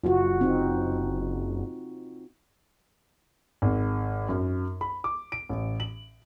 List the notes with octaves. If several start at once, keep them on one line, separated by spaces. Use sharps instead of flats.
F#1 F4 F#4
C4 D#4
G#1
F#2
B5
D6
D7
A1
F#7